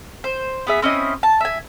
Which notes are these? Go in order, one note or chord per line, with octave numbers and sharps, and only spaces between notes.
C5
B3 G#4 E5
C4 C#4 E4 D#5
A5
E5 G#5